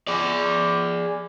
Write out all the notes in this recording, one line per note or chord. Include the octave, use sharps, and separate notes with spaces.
G#4 D5